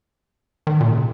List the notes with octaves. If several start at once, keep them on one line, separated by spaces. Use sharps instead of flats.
D#3
A#2
C#3